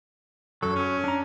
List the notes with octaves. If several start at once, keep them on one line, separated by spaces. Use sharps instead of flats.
F#2 F#3 A4
C#4
D4 A#5